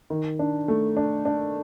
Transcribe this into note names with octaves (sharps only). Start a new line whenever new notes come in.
D#3
D4
A3
D4
D4